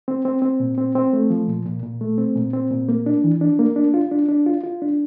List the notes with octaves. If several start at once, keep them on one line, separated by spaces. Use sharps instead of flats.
C4
C4
C4
A#2
C4
C4
A3
F3
A#2
A#2
A#2
A3
C4
A#2
C4
A#2
A#3
D4
E3
D4
A#3
D4
F4
D4
D4
F4
F4
D4